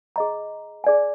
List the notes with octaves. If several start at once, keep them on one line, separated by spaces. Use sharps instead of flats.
G#4 D#5 A#5
G#4 D5 G#5